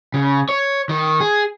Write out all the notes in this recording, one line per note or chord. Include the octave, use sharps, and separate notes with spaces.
C#3
C#5
D#3
G#4